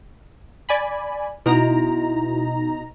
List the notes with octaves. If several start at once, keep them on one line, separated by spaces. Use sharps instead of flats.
D5 G#5 B5
B2 D#4 E4 F#4 A#5